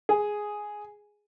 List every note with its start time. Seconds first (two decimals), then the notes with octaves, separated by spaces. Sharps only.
0.09 G#4